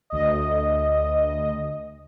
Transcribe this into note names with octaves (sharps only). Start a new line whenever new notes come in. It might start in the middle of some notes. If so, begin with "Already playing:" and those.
D2 D#5